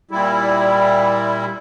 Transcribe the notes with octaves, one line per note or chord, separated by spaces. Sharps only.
A#2 G3 E4